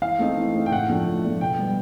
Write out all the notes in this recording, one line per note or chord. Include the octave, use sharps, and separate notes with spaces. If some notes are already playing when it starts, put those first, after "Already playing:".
E3 F5
A3 C4 D#4
E3
A3 C4 D#4
G5
A2 F#5
F3 A3 D4
A2
F3 A3 D4
B2 G5
G3 B3